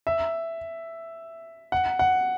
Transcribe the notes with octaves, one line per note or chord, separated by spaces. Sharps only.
E5
F#5
F#5